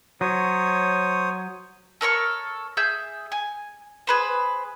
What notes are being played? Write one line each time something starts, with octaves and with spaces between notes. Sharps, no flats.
F#3 C5 C#5 D#6
A4 A#4 C#5 C#6
G#4 E5 G6
G#5
G#4 B4 C5